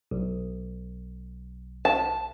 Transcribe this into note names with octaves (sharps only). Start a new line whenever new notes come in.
B1
A5